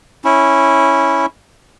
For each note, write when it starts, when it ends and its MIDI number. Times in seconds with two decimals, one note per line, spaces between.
0.25 1.26 61
0.25 1.26 64